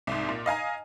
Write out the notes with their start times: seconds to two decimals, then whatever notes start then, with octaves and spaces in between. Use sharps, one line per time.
0.07 C2 G#2
0.29 A#2
0.46 D#5 F5 G#5 A#5